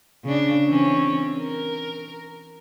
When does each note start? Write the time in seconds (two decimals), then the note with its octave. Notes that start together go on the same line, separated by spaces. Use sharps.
0.25 C#3 D4
0.67 E3 C4 C#4
1.39 A#4